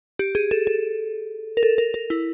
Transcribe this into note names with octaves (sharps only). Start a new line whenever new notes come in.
G4
G#4
A4
A4
A#4
A4
A#4
A#4
E4